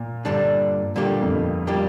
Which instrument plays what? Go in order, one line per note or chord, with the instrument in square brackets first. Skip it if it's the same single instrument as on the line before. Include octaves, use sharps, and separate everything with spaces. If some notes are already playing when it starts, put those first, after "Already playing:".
Already playing: [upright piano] A#2
[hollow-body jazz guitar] G2 D3 G3 D4
[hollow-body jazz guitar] A#2 G3 A#3 G4 [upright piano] D3
[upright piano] F2
G2
[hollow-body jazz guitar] A#2 G3 A#3 G4